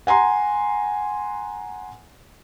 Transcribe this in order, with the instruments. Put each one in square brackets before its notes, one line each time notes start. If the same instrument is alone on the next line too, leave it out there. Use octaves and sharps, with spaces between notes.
[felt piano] F#5 G#5 A#5 C6